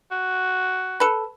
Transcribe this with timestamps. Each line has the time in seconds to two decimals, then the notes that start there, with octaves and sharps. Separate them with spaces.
0.11 F#4
1.00 A4 B4